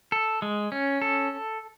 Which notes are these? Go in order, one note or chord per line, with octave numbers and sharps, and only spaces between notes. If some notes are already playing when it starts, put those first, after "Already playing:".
A4
G#3
C#4
A4